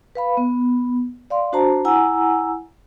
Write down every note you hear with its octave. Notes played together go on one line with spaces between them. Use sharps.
B4 F5 B5
B3
D5 F5 C6
D4 F#4 C5 A5 A#5
E4 F#5 G#5 A#5 E6